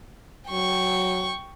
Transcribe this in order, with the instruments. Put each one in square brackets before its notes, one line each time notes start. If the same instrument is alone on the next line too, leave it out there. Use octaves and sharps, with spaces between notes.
[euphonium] F#3 [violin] G5 C#6